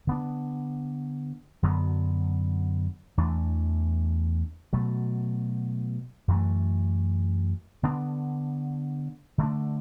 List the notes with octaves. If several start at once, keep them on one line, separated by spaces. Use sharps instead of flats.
D3 B3 D4
F#2 D3 F#3 B3
E2 E3 A3 D4
B2 F#3 A3
F#2 E3 A3
D3 B3 D4
D3 A3 D4